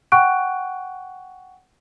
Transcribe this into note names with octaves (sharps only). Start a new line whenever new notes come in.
F#5 G5 C#6 F#6 D7